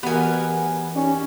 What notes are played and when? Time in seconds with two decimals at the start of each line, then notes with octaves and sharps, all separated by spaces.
0.03 A1 B3 F#4 G4 A#4 G#5
0.96 C#4 D#4 G4 D5